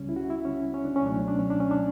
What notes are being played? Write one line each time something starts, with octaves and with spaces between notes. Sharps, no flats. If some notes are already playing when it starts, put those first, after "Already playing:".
Already playing: C#2 C#3 G3 C#4
E4
F#4
E4
C#4
C#4
D4
C#4
C#2 B2 F#3 A3 D4
C#4
D4
C#4
D4
C#4
D4